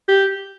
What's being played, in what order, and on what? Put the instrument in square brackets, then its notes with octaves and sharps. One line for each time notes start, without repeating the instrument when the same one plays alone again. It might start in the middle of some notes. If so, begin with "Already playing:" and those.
[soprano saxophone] G4